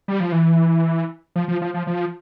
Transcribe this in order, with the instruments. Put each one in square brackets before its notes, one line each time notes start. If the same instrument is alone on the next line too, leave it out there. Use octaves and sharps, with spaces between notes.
[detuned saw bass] G3
F3
E3
F3
F3
F3
F3
F3